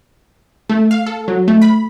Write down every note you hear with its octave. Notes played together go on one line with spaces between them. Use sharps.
A3
F5
A4
F#3
A3
B5